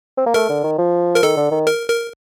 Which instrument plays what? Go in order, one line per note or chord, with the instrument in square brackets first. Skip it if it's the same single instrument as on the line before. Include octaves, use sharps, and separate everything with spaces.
[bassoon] C4
A#3
[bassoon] A3 [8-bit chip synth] A#4
[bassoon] D3
D#3
F3
[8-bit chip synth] A#4
[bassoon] D#3 [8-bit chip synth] A4
[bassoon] D3
D#3
[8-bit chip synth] A#4
A#4